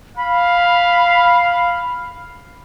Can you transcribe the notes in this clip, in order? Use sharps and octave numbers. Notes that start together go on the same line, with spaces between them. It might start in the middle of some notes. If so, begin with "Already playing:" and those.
F5 B5